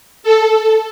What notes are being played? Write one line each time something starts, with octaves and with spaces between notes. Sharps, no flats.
A4